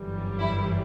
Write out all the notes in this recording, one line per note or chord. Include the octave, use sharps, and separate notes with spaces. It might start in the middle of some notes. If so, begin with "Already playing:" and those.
Already playing: G1 F#2 E3 G3
E4